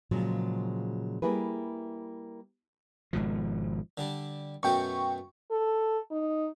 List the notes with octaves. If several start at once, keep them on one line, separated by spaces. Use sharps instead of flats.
A#2 C#3 F3 F#3 G#3
G3 A#3 E4 G#4 B4
G#1 G#2 B2 F3
D3 G3 D4
F#2 B2 A3 G5 C#6
A4
D#4